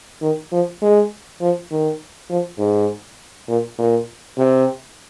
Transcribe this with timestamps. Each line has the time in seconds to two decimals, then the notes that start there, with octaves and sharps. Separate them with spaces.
0.22 D#3
0.52 F3
0.82 G#3
1.41 F3
1.71 D#3
2.30 F3
2.59 G#2
3.49 A#2
3.78 A#2
4.38 C3